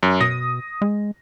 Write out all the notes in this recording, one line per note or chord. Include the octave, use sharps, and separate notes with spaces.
F#2
B2 D#6 A#6
G#3